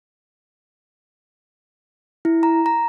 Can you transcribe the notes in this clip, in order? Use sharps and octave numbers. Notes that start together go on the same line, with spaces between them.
E4
A#5
A#5